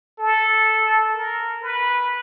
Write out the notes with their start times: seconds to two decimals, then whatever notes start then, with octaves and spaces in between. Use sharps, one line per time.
0.19 A4
1.15 A#4
1.63 B4